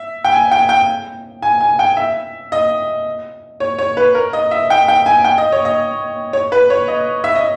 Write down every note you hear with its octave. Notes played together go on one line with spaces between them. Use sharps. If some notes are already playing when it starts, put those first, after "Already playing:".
Already playing: E5
G5
G#5
G5
G5
G#5
G#5
G5
E5
D#5
C#5
C#5
B4
A#4
D#5
E5
G5
G5
G#5
G5
D#5
C#5
D#5
C#5
B4
C#5
D#5
E5
D#5